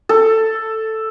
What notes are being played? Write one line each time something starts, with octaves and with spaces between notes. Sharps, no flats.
A4